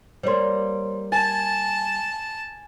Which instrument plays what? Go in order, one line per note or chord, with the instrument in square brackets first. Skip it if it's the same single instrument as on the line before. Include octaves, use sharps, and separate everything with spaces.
[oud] G3 A#3 [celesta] C5 C#5 C6
[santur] G#5 [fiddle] A5 [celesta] A6